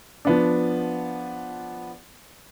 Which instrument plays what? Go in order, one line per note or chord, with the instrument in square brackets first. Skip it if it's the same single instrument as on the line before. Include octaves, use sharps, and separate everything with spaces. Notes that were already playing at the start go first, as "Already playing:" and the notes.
[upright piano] F3 B3 D4